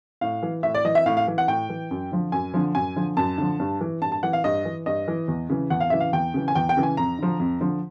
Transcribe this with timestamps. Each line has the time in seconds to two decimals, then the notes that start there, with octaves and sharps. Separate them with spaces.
0.21 A2 F5
0.43 E3
0.63 A2 E5
0.75 D5
0.85 E3 D#5
0.95 E5
1.06 A2 F5
1.17 F5
1.28 E3
1.38 F#5
1.48 A2 G5
1.69 E3
1.91 F#2
2.12 D3 F3
2.32 F#2 G#5
2.54 D3 F3
2.75 F#2 G#5
2.96 D3 F3
3.17 F#2 A5
3.38 D3 F3
3.60 G2
3.81 E3
4.02 G2 A5
4.12 A5
4.23 E3 F#5
4.33 F5
4.44 G2 D#5
4.65 E3
4.86 G2 D#5
5.08 E3
5.28 E2
5.49 C#3 E3
5.70 E2 F#5
5.80 F5
5.90 C#3 E3 E5
6.00 F5
6.13 E2 G5
6.34 C#3 E3
6.48 G#5
6.55 E2 G5
6.69 G5
6.77 C#3 E3
6.83 G#5
6.97 F2 A#5
7.19 D3 F3
7.40 F2
7.60 D3 F3